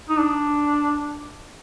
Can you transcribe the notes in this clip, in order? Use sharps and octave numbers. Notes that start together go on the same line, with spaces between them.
D#4
D4